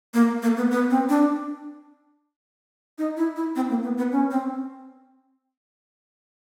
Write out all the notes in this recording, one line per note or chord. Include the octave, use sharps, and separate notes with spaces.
A#3
A#3
B3
B3
C4
D4
D#4
E4
E4
C4
A#3
B3
B3
C#4
C4